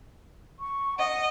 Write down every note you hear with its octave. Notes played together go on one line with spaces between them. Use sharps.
C#6
D#5 F#5